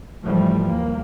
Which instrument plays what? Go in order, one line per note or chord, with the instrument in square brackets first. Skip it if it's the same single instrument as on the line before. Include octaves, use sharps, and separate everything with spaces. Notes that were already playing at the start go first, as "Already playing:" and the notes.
[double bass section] G#2 E3 F3 G3 A3
D#2 A#3